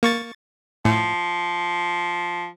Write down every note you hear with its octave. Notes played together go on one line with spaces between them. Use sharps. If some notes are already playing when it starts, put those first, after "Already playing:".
A#3 C#6 A6
A2 F3